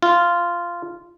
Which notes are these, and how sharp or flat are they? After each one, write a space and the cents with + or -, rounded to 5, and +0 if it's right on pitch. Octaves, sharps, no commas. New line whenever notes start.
F4 -10